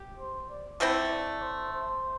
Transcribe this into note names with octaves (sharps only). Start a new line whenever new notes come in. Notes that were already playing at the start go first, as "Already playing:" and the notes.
Already playing: G4
C5
D5
D3 A3 C4 E4 E5
D5
C5
C5